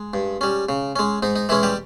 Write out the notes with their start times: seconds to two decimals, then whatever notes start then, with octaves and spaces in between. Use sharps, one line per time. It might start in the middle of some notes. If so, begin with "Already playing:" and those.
Already playing: G#3
0.14 G2
0.41 G3 C#4
0.69 C#3
0.96 G#3 C#4
1.23 G#2 D#4
1.36 D#4
1.49 E3 G#3 C#4 E4
1.63 G3 G4